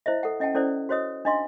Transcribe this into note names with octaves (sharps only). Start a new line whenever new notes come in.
E4 C5 D#5 E5
A4 F#5
C#4 D#5 F#5 G5 A5
C#4 E4 A4 C5 D5
F#4 C5 C#5 D#5 D#6
D4 D#4 D#5 F5 C6